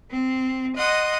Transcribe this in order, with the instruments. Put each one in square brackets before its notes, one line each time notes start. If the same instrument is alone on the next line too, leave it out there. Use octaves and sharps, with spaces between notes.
[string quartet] C4
D#5 F#5 C6 D#6